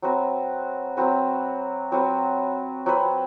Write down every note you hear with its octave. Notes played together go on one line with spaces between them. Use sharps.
F#3 C4 F#4 B4
F#3 C4 F#4 B4
F#3 C4 F#4 B4
F#3 C4 F#4 B4